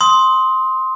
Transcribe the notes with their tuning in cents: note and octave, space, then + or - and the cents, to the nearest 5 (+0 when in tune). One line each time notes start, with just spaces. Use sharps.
C6 +5 D#6 +25